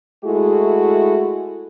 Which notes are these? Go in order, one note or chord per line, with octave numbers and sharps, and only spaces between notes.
G#3 A3 E4 F#4 G#4 A4